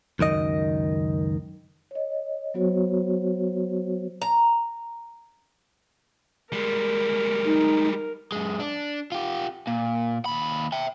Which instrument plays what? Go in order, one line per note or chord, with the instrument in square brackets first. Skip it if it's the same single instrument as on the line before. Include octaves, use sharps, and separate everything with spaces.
[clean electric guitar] C#2 F#2 D#3 D#5
[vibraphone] C#5 D#5
F#3 B3 F#4 C5 C#5
[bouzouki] A#5
[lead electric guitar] G3 G#3 [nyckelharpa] A#4
[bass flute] D#4
[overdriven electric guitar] F#2 G#3
D4
F4 G4
A#2
D#2 B5
E5 G5